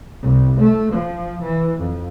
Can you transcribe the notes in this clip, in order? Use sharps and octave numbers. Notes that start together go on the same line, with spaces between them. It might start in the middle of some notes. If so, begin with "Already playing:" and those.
C2
A3
F3
E3
F2